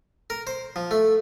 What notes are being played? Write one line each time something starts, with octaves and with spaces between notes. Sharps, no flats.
A#4
C5
F3
A3